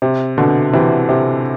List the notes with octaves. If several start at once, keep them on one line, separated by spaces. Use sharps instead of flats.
C3
B2 D3
C3 E3
C3